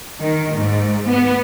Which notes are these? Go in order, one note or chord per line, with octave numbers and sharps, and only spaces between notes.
D#3
G#2
B3